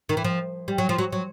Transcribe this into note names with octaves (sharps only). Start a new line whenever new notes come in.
D#3
E3
F3
G3
F#3
F3
F#3
F#3